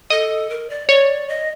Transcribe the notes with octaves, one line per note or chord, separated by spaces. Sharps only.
A4 D#5
A#4
D5
C#5 D5
D#5